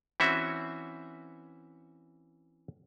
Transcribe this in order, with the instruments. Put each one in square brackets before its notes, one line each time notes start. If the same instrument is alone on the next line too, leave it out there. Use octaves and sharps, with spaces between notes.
[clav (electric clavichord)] E3 C4 C#4 F#4 E5